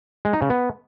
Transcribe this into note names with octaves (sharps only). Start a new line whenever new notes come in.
G#3
D#4
C#3
B3